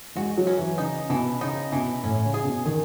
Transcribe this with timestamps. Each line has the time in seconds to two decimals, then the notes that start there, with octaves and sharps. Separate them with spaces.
0.16 G#3 F#4
0.37 F#3
0.47 C#4
0.57 E3
0.78 C#3 D#4
1.10 B2 E3
1.41 C#3 D#4
1.72 B2 E3
2.03 A2 C#4
2.24 C#3
2.34 G#4
2.44 B2
2.65 D#3 G#4